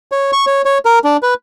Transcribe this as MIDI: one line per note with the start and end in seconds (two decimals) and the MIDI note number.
0.12 0.31 73
0.33 0.45 85
0.47 0.62 73
0.65 0.78 73
0.85 0.99 70
1.04 1.17 62
1.23 1.34 71